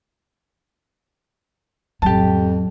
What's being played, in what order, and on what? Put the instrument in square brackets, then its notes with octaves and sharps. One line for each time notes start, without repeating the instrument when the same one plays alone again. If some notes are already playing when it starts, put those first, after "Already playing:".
[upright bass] A1 F#3 [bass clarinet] F2 [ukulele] G4 A5